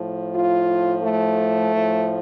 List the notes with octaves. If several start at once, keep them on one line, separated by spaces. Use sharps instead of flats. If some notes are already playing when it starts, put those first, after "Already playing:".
Already playing: A2 F3
F4
A3
A2 F3